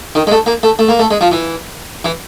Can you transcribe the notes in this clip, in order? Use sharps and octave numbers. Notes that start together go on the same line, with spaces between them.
D#3
G#3
A3
A#3
A3
A3
A#3
A3
G#3
F3
E3
E3